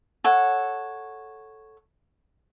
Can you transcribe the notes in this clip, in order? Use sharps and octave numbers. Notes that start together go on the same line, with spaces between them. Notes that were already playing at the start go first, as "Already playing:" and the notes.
A4 C#5 F#5